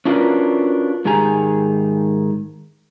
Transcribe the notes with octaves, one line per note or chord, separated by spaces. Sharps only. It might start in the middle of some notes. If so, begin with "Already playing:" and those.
C#4 D4 F4 F#4 A#4 B4
G#2 D#3 G4 G#4 G#5 A#5